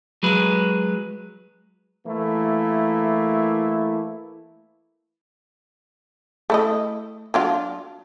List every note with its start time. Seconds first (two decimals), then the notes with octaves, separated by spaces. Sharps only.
0.23 F#3 G#3 B4
2.07 E3 A3 A#3 E4
6.50 A3 E4 D#5
7.34 F#3 D4 F4